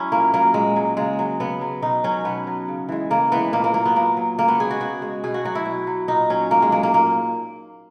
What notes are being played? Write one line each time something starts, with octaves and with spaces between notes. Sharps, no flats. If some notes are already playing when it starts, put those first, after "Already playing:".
Already playing: F#3 C#4 E4
A#2 A#3
F#3 A#3
A#2 G#3
F#3
C#3 G#3
F#3
C#3 B3
F#3
B2 D#4
F#3 C#4
B2 B3
F#3
C#3
E3 G#3
C#3 A#3
E3 G#3 B3
A#2 A#3
A#3
F#3 A#3
B3
A#2 A#3
F#3
C#3 A#3
B3
G#3 G#4
F#4
C#3 F#4
G#3
B2 G#4
F#4
F#3 F#4
E4
B2
F#3
A#2 D#4
F#3 C#4
A#2 A#3
G#3
F#3 A#3
A#3
A#2 A#3